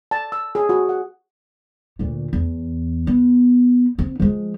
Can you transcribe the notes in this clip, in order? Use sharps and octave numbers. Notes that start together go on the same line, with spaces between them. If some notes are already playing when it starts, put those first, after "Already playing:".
A5
E6
G#4
F#4
F#5
D2 A#2
E2
B3
C4
F3 G#3